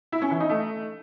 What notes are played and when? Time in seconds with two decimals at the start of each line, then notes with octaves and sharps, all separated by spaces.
0.12 E4
0.22 C#4
0.31 E3
0.40 D#4
0.49 A3